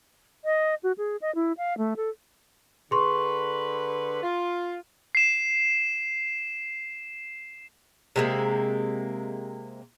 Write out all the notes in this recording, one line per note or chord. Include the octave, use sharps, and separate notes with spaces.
D#5
F#4
G#4
D#5
E4
F5
A3
A4
D3 G#4 B4 C6 C#6
F4
C7 E7
C3 G#3 A#3